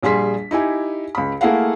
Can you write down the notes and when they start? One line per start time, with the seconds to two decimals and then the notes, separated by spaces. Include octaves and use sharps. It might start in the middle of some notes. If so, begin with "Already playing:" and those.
0.03 A#1 G3 G#4 C6 B6
0.51 D#4 E4 G4 G#5
1.15 C#2 B5
1.41 A3 A#3 E4 G#4 F5 F#5